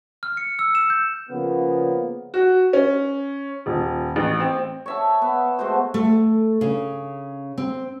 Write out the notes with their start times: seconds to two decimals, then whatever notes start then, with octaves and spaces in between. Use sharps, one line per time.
0.23 F6
0.37 C#7
0.59 E6
0.75 E7
0.90 G6
1.30 C#3 F3 A#3 B3
2.34 F#4
2.73 C#4
3.66 D#1
4.16 A1
4.40 C4
4.86 C#5 E5 A5
5.22 B3
5.59 G#3 A3 F#4 C5
5.94 A3
6.61 C#3
7.58 C4